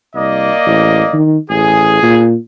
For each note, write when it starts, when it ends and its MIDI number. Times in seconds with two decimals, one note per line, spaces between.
0.14 0.51 36
0.14 1.19 58
0.14 1.19 74
0.14 1.19 75
0.66 1.02 33
1.13 1.37 51
1.50 2.00 33
1.50 2.24 68
2.03 2.34 46